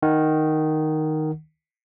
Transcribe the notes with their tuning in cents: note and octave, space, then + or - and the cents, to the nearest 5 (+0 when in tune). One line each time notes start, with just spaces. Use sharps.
D#3 +0 F#5 +0